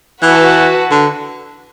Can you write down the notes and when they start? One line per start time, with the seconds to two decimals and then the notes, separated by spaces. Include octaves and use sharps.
0.22 E3 F#4 B4 F#5 A5
0.91 D3